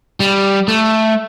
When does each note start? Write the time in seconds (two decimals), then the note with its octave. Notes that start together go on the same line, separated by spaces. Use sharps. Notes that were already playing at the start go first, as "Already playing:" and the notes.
0.20 G3
0.68 A3